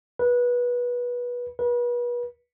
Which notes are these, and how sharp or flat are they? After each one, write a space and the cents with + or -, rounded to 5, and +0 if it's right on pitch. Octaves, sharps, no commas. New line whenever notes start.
B4 -20
B4 -35